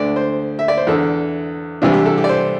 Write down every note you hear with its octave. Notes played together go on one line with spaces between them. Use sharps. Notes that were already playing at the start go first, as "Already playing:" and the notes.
Already playing: D2 D3 D5
C5
E5
D5
C5
E2 D3 A4
C2 C3 E3 D4
G4
A4
G4
D5
C5